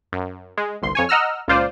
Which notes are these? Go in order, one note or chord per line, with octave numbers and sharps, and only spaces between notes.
F#2
G#3
G1 C2 C6
F2 C#5 G#5
D#5 F#5 A#5 E6 F6
C#2 A#2 F4 C5 D5